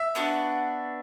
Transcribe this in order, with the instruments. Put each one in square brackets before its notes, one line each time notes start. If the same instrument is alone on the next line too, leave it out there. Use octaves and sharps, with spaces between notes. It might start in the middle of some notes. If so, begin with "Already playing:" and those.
Already playing: [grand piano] E5
[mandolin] B3 D4 F#4